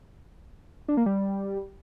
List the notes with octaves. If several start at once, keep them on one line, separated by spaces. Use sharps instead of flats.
D4
A#3
G3